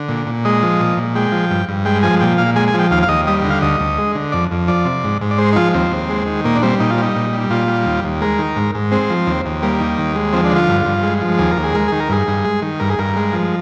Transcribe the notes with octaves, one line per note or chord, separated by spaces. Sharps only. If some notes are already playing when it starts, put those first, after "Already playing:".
Already playing: D3
A#2
A#2
G#3 D#5
F3
A#2
A#2
G#3 G5
F3
G2
G2
G#3 G5
F3 G#5
A#2 G5
A#2 F5
G#3 G#5
G#5
F3
G5
D#2 F5
F5
D#2 D#5
G3 D#5
D3
F5
D2 D#5
D2
G#3
D3
F2 D5
F2
F3 D5
C3
G#2
G#2
D5
G#3 C5
D#4
F3 F4
D#2 C4
D#2
G#3
D#3
A#2 A#3
D4
G3 C4
A#2 D#4
F4
G3 D#4
A#2
G3
A#2 F4
G3
D#2
D#2
G#3 A#4
D#3
G#2
G#2
G#3 C4
F3
D#2
D#2
G3 A#3
D#3
D#2
G#3
F3 C4
D4
D3
F4
G2
G2
G#3
F3
D#2 G#4
A#4
D#2
G#4
G#3 A#4
D#3 G#4
A#4
G2 G#4
G2
G#3
D#3
G2 A#4
G#4
G2 A#4
G#3
F3